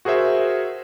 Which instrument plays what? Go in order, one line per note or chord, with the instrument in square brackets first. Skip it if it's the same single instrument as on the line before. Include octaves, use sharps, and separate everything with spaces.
[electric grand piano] F#4 G#4 A#4 C5 E5